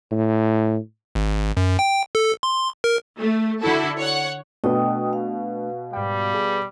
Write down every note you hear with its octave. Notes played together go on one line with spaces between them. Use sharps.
A2
G#1
F#2
G5
A4
C6
A#4
A3
D3 E4 F#4 A4
C#5 F#5
B2 A3 B3 D4 D#5 G5 D#6
F5
G#2 G3 G5
G#4